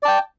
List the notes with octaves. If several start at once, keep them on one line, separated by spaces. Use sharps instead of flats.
D5 G5 A5